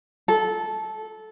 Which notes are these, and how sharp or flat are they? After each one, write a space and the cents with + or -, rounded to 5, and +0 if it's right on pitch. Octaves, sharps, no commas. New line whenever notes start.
A4 -15